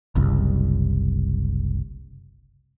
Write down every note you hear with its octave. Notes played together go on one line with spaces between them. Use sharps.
F#1 C2